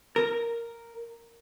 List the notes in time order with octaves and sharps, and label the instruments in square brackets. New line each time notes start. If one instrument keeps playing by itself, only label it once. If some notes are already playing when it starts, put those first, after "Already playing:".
[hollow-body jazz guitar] A#4